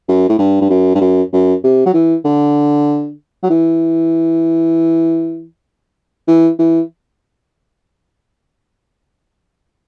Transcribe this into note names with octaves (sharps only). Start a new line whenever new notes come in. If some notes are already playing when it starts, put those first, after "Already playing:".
F#2
A2
G2
G2
F#2
G2
F#2
F#2
C3
F#3
E3
D3
F#3
E3
E3
E3